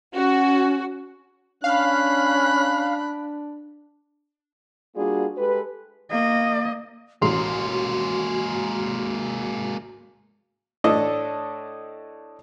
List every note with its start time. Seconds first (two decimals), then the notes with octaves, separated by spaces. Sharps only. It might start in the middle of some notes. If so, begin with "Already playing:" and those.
0.14 C#4 F#4
1.64 C#4 D4 F5 B5 F#6
4.96 G3 A#3 D4 F4 F#4 G#4
5.37 G#3 G4 A4 B4
6.11 A#3 D#5
7.22 A1 G#3 A#3 F#4 C6
10.84 A2 D4 A4 D#5